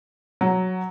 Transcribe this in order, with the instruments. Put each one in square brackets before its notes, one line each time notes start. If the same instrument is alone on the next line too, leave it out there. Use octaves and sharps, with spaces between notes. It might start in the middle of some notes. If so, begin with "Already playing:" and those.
[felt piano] F#3